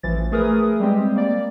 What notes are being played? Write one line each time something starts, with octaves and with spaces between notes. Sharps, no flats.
A1 E3 F3 A6
A3 G#4 A#4 B4 D#6
G3 G#3 C4 G4
A#3 D5